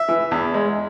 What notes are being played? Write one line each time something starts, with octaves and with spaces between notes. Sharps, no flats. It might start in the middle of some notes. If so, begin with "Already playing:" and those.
Already playing: E5
E3
E2
G#3